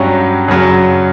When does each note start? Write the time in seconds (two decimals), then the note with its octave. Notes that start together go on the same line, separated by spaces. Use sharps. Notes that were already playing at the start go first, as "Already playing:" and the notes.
Already playing: G2 F#3 C#4 G4 C#5
0.48 F#2 C#3 F#3 C#4